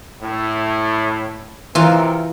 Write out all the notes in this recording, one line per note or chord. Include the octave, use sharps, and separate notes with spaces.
A2
C3 D#3 E3 F4 A#4